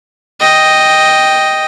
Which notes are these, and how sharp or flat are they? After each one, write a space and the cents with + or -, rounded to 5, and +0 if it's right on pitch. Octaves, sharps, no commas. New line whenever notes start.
D#5 +0 G5 +0